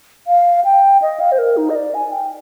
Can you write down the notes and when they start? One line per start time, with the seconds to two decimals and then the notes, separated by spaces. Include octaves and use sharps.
0.27 F5
0.65 G5
1.02 D#5
1.20 F5
1.32 C5
1.38 A#4
1.57 D#4
1.70 D#5
1.76 D5
1.94 G#5
2.12 G5